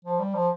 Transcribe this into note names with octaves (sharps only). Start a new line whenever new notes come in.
F3
G3
F3